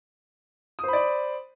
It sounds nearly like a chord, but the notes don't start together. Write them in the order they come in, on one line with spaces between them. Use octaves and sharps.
D#6 C5 B5 D5